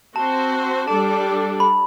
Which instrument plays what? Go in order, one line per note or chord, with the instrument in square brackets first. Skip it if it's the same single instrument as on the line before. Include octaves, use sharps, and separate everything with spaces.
[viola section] C4 F#4 C5 [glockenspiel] A5
[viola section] G3 D4 A4 D5 [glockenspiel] A5
[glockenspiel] B5